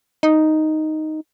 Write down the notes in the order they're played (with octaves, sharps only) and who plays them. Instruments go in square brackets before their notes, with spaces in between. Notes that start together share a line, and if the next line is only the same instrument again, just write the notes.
[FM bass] D#4